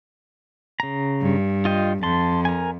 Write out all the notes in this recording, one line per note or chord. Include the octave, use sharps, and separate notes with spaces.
C#3 A#5
G2
F4 D#5 G5
F2 A5 C6
A#4 G#5